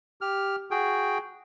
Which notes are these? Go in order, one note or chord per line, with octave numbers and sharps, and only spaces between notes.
G4 F6
F#4 G#4 G5